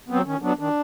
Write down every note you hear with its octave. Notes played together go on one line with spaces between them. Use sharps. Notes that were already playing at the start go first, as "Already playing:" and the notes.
F#3 B3 C4
D#3 C#4
F#3 B3 D4
D#3 D4